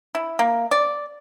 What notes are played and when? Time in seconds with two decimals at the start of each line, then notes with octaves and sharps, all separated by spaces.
0.15 E4
0.39 A#3
0.71 D5